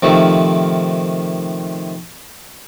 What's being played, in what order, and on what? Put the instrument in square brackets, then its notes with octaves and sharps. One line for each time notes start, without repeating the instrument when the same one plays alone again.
[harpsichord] C3 D#3 F3 A3